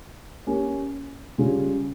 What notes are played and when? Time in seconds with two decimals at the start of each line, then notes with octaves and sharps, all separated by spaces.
0.47 A#3 C#4 G4 A#4
1.38 C#3 G3 C#4 F4 G#4